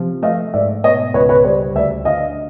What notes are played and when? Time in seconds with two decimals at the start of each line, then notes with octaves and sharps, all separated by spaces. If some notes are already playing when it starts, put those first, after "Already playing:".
Already playing: C3 F3
0.23 A3 D#5 F5
0.54 G#2 D5 E5
0.84 B2 C#5 D#5
1.14 C#2 B4 C#5
1.29 B4 C#5
1.45 G3 C5 D5
1.75 D2 D5 E5
2.05 D2 D#5 F5